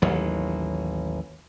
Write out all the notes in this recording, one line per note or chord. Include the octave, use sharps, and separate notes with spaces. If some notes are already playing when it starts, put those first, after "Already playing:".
A1 D#2 F#3